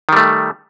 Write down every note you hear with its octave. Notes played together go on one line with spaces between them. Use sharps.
D#3 G3 A3